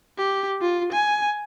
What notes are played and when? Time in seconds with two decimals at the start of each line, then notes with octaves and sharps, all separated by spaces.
0.18 G4
0.62 F4
0.92 G#5